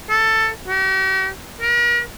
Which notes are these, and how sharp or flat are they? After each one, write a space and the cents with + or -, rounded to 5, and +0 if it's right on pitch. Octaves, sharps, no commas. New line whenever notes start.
A4 +10
G4 -45
A#4 +40